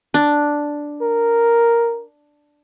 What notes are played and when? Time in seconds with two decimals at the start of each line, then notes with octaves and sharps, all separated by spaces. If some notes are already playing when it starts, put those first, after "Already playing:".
0.14 D4
1.02 A#4